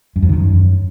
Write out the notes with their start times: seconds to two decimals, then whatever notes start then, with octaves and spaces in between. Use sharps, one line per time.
0.16 F#2
0.22 F2
0.29 D#3
0.36 F#2